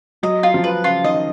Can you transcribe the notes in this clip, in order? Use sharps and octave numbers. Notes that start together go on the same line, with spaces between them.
F#3 D#5
F4
F3
B4
C#3 F4
D#3 D#5